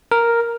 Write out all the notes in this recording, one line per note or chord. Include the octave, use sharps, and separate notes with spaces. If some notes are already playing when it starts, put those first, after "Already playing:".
A#4